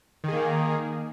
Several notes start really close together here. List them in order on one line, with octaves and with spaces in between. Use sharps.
D#3 G#4 A#3